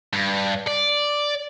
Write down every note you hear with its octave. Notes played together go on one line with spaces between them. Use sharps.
G2
D5